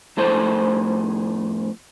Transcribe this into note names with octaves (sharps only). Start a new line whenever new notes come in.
F2 A2 A3 A4 C5 D#5